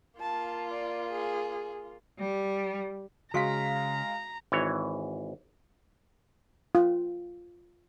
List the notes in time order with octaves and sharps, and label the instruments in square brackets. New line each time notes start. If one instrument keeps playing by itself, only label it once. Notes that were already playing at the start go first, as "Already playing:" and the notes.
[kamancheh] A#3 F4 [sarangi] A5
[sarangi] D5
G#4
[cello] G3
[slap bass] C#3 [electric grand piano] G#3 F5 B6 [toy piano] F#4 C#6 [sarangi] A#5
[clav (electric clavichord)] G#1 E3 C#5
[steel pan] F4